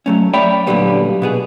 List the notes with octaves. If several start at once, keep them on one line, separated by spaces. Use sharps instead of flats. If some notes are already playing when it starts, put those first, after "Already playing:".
F#3 A3 C#4
C#5 D5 E5 G5 B5
A#2 D3 E3 F#3 G3 B3
B2 B3 G#4